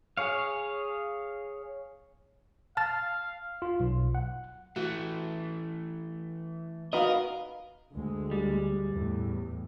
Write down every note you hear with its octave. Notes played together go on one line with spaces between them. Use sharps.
G#4 C#5 F5
F5 A5 F6 A6
F4
B1
F#5
E3 A3 F#4
D#4 F#4 A#4 B4 D#5 F5
D2 G#3
G3
E2 A2